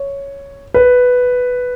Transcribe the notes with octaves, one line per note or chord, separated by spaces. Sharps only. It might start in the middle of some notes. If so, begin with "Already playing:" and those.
Already playing: C#5
B4